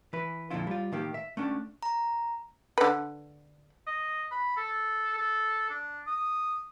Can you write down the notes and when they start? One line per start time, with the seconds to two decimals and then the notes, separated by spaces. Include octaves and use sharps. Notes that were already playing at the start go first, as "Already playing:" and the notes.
0.13 E3 B4
0.50 F2 A#2 D3 C4 E4 F4
0.67 G3 F4
0.92 A2 D#3 A#3 G4
1.14 E5
1.37 A3 C#4 D4
1.83 A#5
2.78 D3 B4
3.87 D#5
4.31 B5
4.57 A4
5.17 A4
5.70 D4
6.07 D#6